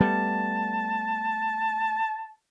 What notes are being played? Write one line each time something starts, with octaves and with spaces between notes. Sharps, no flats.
G3 A3 B3 A5